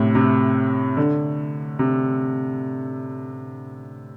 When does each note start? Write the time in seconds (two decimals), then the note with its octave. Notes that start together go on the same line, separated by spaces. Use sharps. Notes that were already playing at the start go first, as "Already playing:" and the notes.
Already playing: A2 C3
0.15 C3
0.97 D3
1.79 C3